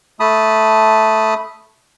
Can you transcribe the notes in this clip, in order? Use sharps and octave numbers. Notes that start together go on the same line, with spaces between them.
A3 A5 B5 D#6